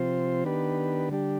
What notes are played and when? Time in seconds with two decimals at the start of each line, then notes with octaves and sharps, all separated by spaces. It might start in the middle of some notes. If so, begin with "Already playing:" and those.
Already playing: C3 F3 C4 F4 C5
0.44 D#3 B3 D4 G4 B4
1.09 D3 G3 D4 G4